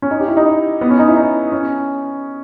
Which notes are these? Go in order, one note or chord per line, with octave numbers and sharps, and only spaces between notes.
C#4
D#4
G4
E4
D#4
B3
C#4
D#4
E4
D#4
C#4